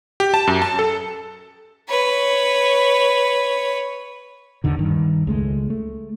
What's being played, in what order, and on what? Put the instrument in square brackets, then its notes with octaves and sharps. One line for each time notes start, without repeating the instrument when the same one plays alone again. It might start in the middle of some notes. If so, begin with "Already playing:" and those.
[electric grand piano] G4
A5
F#2
A5
A4
[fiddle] B4 C#5
[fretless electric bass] D#2 D3 D#3
G2 D#3
C#2 G#3 A3
A3